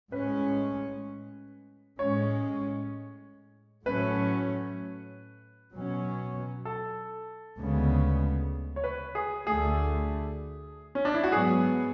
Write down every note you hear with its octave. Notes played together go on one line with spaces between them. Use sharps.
A2 G#3 C#4 B4
A2 G#3 C#4 C#5
A2 F#3 A3 C#4 B4
B2 F#3 C#4
A4
D2 C#3 G#3 B3
C#5
B4
G#4
D2 D3 A3 G#4
C#4
D4
E4
F#4
G#2 F#3 B3 G#4